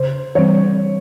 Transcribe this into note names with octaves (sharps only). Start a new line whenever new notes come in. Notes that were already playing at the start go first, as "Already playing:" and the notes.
Already playing: C#3 C5
E3 G3 C4 C#5